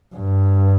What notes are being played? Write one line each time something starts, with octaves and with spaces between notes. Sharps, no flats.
G2